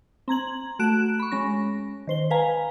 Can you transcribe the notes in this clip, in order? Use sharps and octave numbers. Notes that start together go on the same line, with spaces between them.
C4 A#5 G#6 F#7
A3 F#4 F#6 D7 E7
B5 C#6
G#3 C#4 A#6
D#3 C5 G7
B4 F5 G#5 A#5